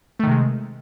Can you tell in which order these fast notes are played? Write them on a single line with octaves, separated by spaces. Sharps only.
A3 D#3 C3 G#3